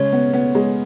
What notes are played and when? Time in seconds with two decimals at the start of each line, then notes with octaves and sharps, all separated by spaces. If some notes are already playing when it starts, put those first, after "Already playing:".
Already playing: C#3 G#3 C#5
0.12 B3
0.33 B3
0.55 G#3